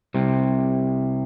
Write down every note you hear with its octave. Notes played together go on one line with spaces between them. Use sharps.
C2 C3